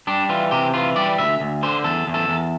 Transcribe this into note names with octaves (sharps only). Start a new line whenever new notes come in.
G3 D4
E3 F4
C3 G4
E3 F4
G3 D5
D2 E5
D2
D3 C5
E2 A4
E2
A4
E2